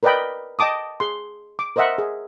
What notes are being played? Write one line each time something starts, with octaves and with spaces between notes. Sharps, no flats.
A#4 B4 D5 D#5 G5 B5
D#5 G5 A5 D6 D#6
G#4 C6
D6
A#4 C5 D#5 E5 F#5
G#4